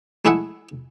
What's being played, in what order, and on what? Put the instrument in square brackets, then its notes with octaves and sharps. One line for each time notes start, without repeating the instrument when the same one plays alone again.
[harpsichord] G#3 A3 E4 G#4 E5 F#5